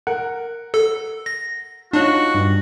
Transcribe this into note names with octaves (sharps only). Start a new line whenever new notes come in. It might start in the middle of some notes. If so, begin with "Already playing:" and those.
A#4 F#5
A4
A#6
D4 D#4 F4 F#4 C#5
G2